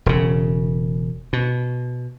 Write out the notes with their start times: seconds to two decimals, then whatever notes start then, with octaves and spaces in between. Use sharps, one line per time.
0.06 E1 C#3
1.33 B2